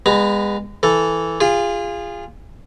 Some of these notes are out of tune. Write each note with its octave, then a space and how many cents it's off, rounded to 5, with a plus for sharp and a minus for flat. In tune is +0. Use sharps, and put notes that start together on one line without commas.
G#3 -30 B3 +0 A#5 +0
E3 +0 A4 +0
F4 -10 G#4 -30